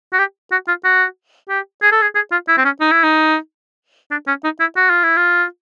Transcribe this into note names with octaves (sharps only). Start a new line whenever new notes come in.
F#4
G4
F#4
F4
F#4
G4
G#4
A4
G#4
G#4
F4
E4
C4
C#4
D#4
E4
D#4
D4
C#4
D#4
E4
F#4
F4
E4
F4